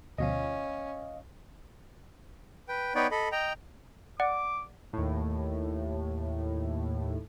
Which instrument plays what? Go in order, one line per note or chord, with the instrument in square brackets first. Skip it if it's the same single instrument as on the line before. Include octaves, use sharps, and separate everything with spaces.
[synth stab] D2 B2 F3 [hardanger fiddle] C#4 [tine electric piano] D#5 F5
[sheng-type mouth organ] B4 G5
B3 D#4 B4 C#5 D5 G5
A4 D#5 B5
D#5 G5 A#5
[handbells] D5 F#5 [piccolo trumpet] D6
[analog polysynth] D#2 A2